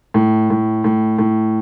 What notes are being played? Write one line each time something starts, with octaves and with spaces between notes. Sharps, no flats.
A2
A2
A2
A2